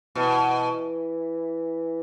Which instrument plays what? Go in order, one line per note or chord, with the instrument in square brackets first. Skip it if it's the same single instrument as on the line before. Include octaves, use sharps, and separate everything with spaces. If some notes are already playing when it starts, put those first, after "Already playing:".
[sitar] B2 [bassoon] E3